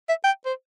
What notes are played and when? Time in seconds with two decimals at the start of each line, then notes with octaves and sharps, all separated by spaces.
0.09 E5
0.24 G5
0.46 C5